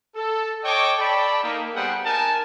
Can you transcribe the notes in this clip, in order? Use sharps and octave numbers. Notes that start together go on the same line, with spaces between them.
A4
C#5 D#5 G5 A5 C#6 D6
A4 D5 G5 A5 B5
A#3 D#4
G3 B3 G#4 C5 F#5 G5
D#4 A#4 G#5 A5